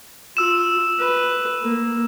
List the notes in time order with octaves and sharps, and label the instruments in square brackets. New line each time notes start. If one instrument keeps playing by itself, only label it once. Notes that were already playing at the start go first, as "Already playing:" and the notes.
[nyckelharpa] F4 [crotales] E6 E7
[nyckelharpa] B4
A#3